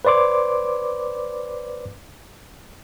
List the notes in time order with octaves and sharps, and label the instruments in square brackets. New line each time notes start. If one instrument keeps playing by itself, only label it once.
[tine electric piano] B4 C5 D5 C6 D6